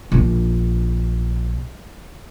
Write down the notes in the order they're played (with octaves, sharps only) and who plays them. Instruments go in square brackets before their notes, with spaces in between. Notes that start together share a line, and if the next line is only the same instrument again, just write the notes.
[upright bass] A#1 D4